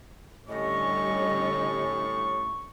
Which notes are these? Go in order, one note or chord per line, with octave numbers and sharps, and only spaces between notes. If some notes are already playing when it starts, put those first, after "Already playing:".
A2 D3 G3 C#4 D#5 C#6